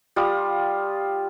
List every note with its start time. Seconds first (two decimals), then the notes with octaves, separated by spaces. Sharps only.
0.16 G3 F4 D#6